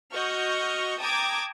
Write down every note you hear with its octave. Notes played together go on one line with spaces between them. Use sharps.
F#4 D#5 C#6 F6 G6
G5 A5 A#5 D6 D#6 G#6